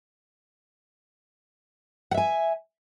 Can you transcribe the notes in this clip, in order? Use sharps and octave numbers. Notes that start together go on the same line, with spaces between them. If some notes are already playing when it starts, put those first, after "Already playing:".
E5 F#5 G#5